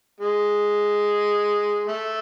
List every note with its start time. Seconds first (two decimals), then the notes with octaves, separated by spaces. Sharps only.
0.21 G#3
1.88 A3